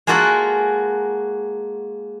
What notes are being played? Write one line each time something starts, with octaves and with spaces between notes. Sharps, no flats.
G#3 A#3 F4 F#4 A4 F#5